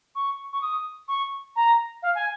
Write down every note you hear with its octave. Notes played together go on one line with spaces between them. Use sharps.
C#6
C#6
D#6
C#6
A#5
F5
G#5